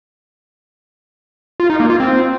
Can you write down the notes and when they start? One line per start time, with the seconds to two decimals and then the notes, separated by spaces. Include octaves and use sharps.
1.60 F4
1.70 D#4
1.80 A#3
1.90 F4
2.00 C4